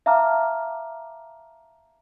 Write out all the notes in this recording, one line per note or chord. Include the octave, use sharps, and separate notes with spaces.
E5 F5 A5 A#5 D6 F6